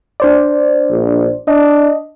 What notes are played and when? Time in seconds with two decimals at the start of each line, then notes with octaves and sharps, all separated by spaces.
0.20 D4 C5 D5
0.90 A#1
1.48 D4 D#5